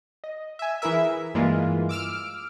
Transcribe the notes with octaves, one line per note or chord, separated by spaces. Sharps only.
D#5
E5 G#5
E3 E4 G#4 A#4 E5
G2 E3 G#3 A#3 F4
D6 E6 F6 D7